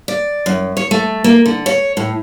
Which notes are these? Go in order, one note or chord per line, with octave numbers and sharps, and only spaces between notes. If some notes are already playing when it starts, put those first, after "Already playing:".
D5
F#2
C#5
A3
A#3
D3
C#5
A2